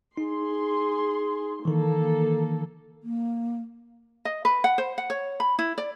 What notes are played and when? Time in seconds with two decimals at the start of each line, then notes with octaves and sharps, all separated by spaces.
0.17 D#4 G#4 C6
1.65 D#3 E3 A#3 A4
3.03 A#3
4.25 D#5
4.45 B4
4.64 F#5
4.78 C5
4.98 F#5
5.10 C#5
5.40 B5
5.59 E4
5.78 D5